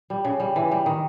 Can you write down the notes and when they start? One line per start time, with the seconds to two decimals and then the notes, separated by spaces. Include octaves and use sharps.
0.10 G3
0.25 C#3
0.40 G3
0.56 E3
0.71 G3
0.86 D#3